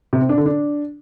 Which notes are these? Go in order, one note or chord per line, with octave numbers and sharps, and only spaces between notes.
C3
C4
D4
D3
D4